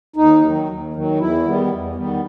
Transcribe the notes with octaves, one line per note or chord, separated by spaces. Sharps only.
D#2 D#4
D#3 F#3
D#2
D#3 F#3
E2 E4
D#3 G3 B3
E2
D#3 G3 B3